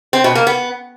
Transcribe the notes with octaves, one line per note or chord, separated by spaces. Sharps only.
C4
B2
A#3
B3